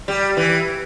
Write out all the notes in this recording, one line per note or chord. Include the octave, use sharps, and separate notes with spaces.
G3
E3